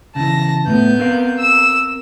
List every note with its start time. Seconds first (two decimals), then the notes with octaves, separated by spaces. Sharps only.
0.16 C#3 E3 A5 A#6
0.67 A2 A3 B3 G6
0.99 C4 A#4 F5
1.39 E6 E7